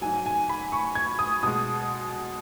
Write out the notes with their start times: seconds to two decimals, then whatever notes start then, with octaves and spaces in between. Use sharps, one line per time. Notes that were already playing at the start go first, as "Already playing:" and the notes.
0.01 G#2 F#3 G#5
0.26 G#5
0.49 B5
0.72 C#6
0.95 G#6
1.19 D#6
1.43 B2 G#3 D#6